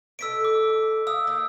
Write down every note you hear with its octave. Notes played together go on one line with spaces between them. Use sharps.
B2 A4 D#5 E6 B6 D7
D6
F5 D#6 E6
A#3 D#4